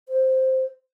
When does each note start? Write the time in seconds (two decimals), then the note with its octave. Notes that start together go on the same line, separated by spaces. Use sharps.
0.09 C5